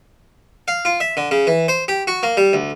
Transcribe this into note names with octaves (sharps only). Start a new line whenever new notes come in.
F5
F4
E5
D3
C#3
E3
C5
G4
F#4
A#3
G3
D2